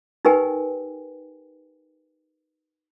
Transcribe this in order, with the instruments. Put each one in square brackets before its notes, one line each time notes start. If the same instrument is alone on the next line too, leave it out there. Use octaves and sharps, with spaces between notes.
[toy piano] D#4 G4 A#4 B4 G5 G#5